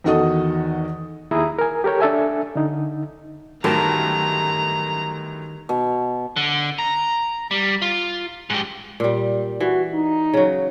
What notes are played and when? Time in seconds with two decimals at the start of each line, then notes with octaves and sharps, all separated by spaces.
0.04 E2 D#3 F#4 A4 D#5 D#6
1.31 D#2 E4 G#4 A#5 D#6
1.59 A#4 G#5
1.84 G4 A4 A#4 C#5 G5
2.00 D4 A4 E5 G#5
2.55 D3 D#4
3.64 G1 F#2 A2 D#3 G4 A#4 A5 A#5
5.69 B2
6.36 D3
6.79 A#5
7.51 G3
7.82 F4
8.50 G#2 G4
9.00 A#2 G3
9.60 E3 F#4
9.94 D#4
10.34 C#3 F#3